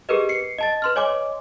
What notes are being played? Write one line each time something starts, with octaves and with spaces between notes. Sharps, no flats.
G4 G#4 A#4 B4 D#5
C7 C#7
D#5 A5 A6
B4 C6 F6
C#5 D#5 G#5 C6 D6